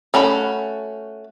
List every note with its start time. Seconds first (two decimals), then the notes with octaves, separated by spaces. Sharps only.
0.14 A3 C#4 F#4 B5